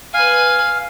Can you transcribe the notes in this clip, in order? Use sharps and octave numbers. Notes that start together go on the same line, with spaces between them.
B4 F5 G#5